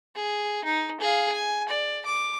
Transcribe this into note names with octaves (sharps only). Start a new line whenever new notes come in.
G#4
D#4
G#4 F5
G#5
D5
D6